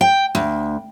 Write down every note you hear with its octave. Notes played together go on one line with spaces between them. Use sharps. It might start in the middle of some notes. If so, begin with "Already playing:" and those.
G5
D2